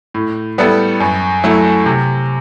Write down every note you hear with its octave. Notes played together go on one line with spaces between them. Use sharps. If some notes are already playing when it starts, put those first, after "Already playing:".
A2
G3 B3 E4 A4
F#2
F#3 A3 E4
C3